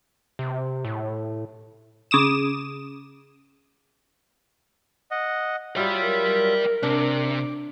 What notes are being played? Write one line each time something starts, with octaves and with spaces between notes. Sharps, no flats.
C3
A2
C#3 D6 D#6 E7
D#5 F#5
F#3 G3 F4 D5 E5 G5
A#4
C3 D4 D6